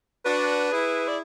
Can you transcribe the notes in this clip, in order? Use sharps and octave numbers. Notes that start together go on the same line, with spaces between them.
D4 F#4 B4
E4 G#4
D5